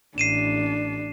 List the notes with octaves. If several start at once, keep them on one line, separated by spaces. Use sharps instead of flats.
A1 D4 C7 D#7 E7